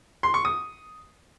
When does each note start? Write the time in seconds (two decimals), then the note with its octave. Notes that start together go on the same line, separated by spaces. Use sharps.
0.23 C6
0.34 C#6
0.45 D#6